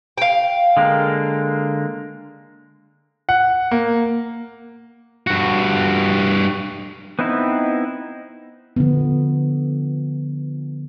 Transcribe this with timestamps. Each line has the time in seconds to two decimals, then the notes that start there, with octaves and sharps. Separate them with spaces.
0.18 F5 G5
0.77 D3 G#3 A#3
3.29 F#5
3.71 A#3
5.27 G2 F#4
7.19 B3 C4 D#4 E4 B4
8.76 D3 F3 B3